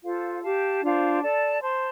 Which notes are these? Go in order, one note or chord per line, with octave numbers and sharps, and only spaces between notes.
F4 A4 C5 F5
G4 F5 A5
D4 F4 C5 F5
A4 D5 A5
C5 A5 C6